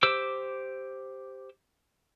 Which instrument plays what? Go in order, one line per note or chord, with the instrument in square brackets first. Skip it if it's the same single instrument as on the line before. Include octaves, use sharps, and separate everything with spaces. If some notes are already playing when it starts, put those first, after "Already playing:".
[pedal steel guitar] G4 C5 D6 E6